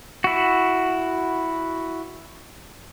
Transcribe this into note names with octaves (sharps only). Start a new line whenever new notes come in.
E4 F#4